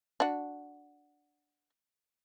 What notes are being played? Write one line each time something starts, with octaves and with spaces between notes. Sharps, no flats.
D4 F#4